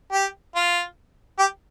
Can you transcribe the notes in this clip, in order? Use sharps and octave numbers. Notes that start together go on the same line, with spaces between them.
G4
F4
G4